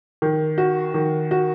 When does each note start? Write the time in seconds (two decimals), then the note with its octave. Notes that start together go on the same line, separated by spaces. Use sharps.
0.22 D#3
0.58 F#4
0.94 D#3
1.31 F#4